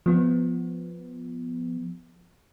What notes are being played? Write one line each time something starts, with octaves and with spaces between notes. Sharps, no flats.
F3 B3